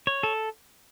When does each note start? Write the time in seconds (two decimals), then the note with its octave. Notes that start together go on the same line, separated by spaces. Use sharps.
0.07 C#5
0.23 A4